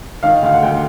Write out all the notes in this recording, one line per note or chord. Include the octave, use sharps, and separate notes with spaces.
D#3 F5
D2 F5
F#5
D2 G5